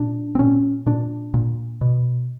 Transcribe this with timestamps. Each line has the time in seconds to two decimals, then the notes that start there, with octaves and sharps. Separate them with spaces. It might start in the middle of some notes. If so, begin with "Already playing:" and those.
Already playing: A#2 D4
0.35 C4
0.39 A#2 C#4
0.86 A#2 D4
1.34 A#2
1.81 B2